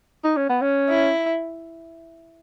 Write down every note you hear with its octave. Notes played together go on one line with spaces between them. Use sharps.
D#4
C#4
B3
C#4
E4